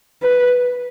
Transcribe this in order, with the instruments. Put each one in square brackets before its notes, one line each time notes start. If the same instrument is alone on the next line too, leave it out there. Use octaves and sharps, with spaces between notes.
[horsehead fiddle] B4